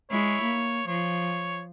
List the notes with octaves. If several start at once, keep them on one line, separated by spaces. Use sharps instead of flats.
G#3 E4 C#5
A#3
F3 C#5